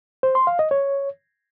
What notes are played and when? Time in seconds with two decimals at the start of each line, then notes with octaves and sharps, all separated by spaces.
0.23 C5
0.35 C6
0.47 F5
0.59 D#5
0.71 C#5